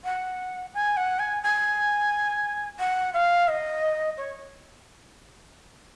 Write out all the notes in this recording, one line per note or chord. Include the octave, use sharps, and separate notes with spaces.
F#5
G#5
F#5
G#5
G#5
F#5
F5
D#5
C#5